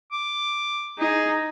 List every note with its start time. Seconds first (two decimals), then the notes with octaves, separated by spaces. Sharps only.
0.12 D6
0.99 D#4 G#4